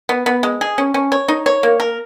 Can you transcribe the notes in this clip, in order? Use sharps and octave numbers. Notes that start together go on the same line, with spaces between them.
B3
B3
G#3
G#4
C#4
C#4
C#5
D#4
C#5
A#3
A#4